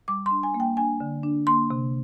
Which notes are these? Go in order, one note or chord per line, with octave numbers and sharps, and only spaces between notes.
G3 D6
D4 C6
G#5
A#3
G5
D4 G#5
D3
D4
A#3 C6
C3